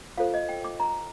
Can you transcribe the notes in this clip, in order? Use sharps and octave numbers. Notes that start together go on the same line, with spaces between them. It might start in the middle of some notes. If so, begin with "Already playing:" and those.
F4 A4 C5 F5
D#5
G5
D6
A#5